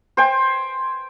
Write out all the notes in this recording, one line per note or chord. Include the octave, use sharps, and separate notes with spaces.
C5 G5 G#5